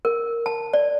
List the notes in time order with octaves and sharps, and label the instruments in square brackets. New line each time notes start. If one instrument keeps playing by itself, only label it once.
[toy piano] A#4
A5
D5